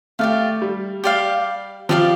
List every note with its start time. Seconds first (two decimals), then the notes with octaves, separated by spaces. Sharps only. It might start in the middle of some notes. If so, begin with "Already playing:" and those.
0.19 A3 G4 D5 F5
0.62 G3
1.04 G4 D5 F5
1.89 F3 G4 D5 F5